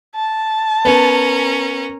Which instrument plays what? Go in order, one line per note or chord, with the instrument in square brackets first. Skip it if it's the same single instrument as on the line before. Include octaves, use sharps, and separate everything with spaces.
[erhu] A5
[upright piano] B3 [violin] C#4 A#4